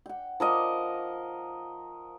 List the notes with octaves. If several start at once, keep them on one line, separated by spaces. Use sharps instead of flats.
F#5 G5
F3 A#4 D#5 D6